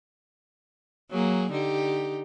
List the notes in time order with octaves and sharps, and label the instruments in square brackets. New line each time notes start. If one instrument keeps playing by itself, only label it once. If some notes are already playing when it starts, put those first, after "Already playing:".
[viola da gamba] F#3 A#3 G#4
D3 D#4 G4